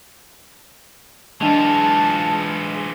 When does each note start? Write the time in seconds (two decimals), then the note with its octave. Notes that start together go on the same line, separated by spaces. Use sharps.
1.41 E3 G#3 D4 F4 A5 F7